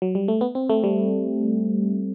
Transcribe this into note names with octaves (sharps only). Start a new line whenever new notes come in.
F#3
G3
A3
B3
C4
A3
G3